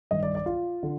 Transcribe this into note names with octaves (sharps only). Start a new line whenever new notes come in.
G2 D#3 D#5
D5
D5
F4
D3